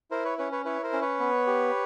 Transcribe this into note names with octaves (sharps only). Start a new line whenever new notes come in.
E4 A#4 C5
B4 C#5
C#4 B4 C#5
B4 C#5
E4 B4 C#5
A#4 C5
C#4
B4 C#5
B3
G4